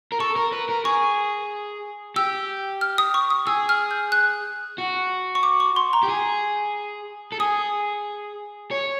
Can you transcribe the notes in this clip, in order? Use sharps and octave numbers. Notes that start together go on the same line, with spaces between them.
A#4
A4 C#6
A#4
B4
A#4
G#4 C#6
G4 E6
F6
D#6
C#6
D#6
G#4 E6
F6
G6
F#6
F#4
C#6
D6
C#6
C6
A#5
G4
G#4
A4
G#4 D#6
C#5